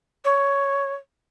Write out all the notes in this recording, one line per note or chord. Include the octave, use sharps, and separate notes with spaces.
C#5